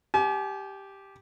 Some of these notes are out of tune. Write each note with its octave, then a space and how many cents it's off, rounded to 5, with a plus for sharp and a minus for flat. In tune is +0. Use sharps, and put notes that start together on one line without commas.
G4 +0 G#5 +45